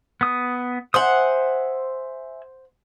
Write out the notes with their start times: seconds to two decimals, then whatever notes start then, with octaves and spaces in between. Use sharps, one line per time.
0.21 B3 D#6
0.94 C5 E5 F#5 G#5 D#6